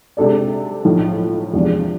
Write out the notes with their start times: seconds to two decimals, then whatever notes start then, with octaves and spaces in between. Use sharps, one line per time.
0.17 C3 G#3 D4 A4 D5
0.85 B1 A2 F3
1.53 E2 C3 F3 G#3 D4